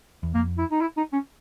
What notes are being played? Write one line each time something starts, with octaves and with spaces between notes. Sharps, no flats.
E2
F2 A#3
E4
D#4
E4
D#4
C#4